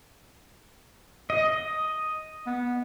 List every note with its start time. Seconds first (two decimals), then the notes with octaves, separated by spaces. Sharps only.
1.30 D#5
2.46 B3